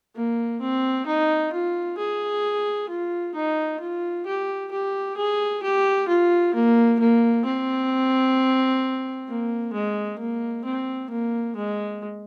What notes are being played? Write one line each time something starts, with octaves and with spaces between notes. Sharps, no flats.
A#3
C4
D#4
F4
G#4
F4
D#4
F4
G4
G4
G#4
G4
F4
A#3
A#3
C4
A#3
G#3
A#3
C4
A#3
G#3